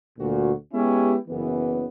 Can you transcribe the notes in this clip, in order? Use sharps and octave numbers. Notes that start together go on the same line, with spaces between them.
D2 A#2 F#4
G#3 B3 C#4 E4 G4
F#1 E3 B3